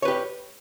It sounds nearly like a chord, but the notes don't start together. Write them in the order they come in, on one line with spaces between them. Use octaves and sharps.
C#5 B4 G4